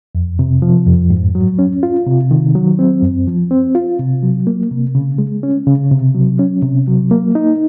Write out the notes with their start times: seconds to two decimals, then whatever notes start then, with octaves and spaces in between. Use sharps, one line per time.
0.15 F2
0.39 C3
0.62 F3
0.86 F2
1.10 G#2
1.35 F#3
1.59 C#4
1.83 F4
2.07 C3
2.31 D#3
2.55 F#3
2.79 C4
3.02 F#2
3.28 F3
3.51 C4
3.75 F4
4.00 C3
4.23 F#3
4.47 A#3
4.71 C3
4.95 C#3
5.18 G#3
5.43 C#4
5.67 C#3
5.91 C3
6.15 F#3
6.39 C#4
6.63 C3
6.87 F#3
7.11 A#3
7.35 D#4